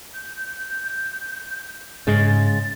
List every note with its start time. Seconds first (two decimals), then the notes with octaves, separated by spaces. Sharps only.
0.14 G6
2.07 G#2 C#3 G#3 A6